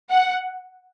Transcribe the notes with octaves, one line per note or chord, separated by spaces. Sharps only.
F#5